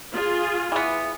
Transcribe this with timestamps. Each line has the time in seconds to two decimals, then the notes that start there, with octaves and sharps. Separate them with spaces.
0.14 F4 G#4
0.72 E3 B3